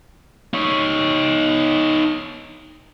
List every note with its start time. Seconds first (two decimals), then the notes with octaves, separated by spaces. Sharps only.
0.54 D#4 C#5